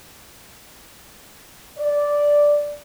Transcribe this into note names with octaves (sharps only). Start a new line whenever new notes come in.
D5